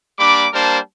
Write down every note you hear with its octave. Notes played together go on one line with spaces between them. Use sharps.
G3 A#3 D4 B5 D6
G3 A#3 D4 A#4 C5 A5